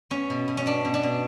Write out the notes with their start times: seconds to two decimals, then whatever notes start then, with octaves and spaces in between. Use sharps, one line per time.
0.10 B3 C#4
0.30 B2
0.48 B2
0.57 C#4
0.66 B3 D4
0.85 B2
0.94 D4
1.03 B2